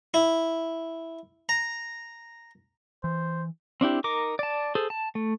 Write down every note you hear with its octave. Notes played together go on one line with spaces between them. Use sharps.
E4
A#5
E3 C5
C4 D4 E4 G4
D#4 A#4 D6
D5 A5
G#4 A4 C5
A5
A3